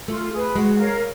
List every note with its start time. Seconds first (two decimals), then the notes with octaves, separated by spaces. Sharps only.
0.08 A3 F4
0.32 G#4 B4
0.55 G#3 F#4
0.78 A#4 C#5 F5